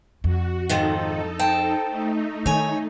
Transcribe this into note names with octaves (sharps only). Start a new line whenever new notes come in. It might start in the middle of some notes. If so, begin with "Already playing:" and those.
F2 F#4
G#2 D#3 F3 D#4 A4
C5 G5 A5
A3 D#4
D#3 C#5 G#5